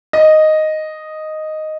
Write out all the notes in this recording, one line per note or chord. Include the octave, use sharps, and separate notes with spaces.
D#5